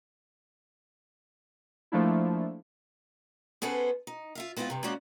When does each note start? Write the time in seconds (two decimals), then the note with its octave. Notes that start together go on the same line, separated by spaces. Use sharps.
1.92 F3 A3 A#3 D4 E4
3.62 B3 C#4 G#4 A4 B4 C5
4.07 D#4
4.35 F4 E5 F5
4.57 G#3 B3 C4 E4 F4
4.70 G2 C3
4.84 G#3 A#3 C#4 F#4 D5